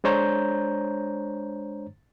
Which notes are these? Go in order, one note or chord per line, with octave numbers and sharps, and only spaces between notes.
G#3 D4 C5 C#5 A#5 G6